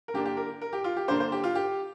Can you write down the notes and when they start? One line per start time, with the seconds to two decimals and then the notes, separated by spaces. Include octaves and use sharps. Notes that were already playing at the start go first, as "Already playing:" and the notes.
0.08 A#4
0.14 D3 A#3 D4 G4
0.26 G4
0.37 A#4
0.62 A#4
0.73 G4
0.84 F4
0.97 G4
1.08 D3 A#3 D4 C5
1.20 C5
1.32 G4
1.44 F4
1.55 G4